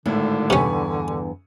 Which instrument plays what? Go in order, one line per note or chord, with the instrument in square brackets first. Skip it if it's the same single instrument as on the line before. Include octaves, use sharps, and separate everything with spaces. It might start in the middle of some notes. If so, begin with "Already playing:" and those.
[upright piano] G#1 A2 [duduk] D3 [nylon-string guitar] E4
[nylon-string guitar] E2 G2 B4 [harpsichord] C3 C#4 [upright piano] G#5 C#6